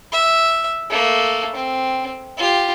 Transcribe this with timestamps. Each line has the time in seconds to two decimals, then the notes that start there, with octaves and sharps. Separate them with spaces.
0.12 E5
0.90 A3 A#3
1.55 C4
2.37 F4 G4